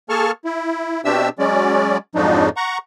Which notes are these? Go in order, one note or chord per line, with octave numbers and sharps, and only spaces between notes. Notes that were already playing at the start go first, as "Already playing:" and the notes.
A#3 G#4 A4 A5 C#6 F6
E4
B2 C4 D4 G4 E5 E6
F#3 G#3 C#4 D5
F2 G#2 F3 F#3 D4 D#4
F#5 A#5 C#6